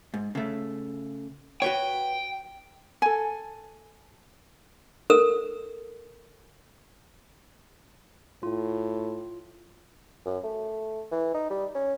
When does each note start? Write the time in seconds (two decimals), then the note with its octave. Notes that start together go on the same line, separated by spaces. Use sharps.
0.14 G#2
0.35 C#3 A3
1.62 F#4 B4 C#5 G5
3.02 A4 G#5
5.10 A4 A#4 E6
8.43 A2 F4
10.26 F#2
10.44 A3
11.11 E3
11.34 D#4
11.50 G3
11.75 C#4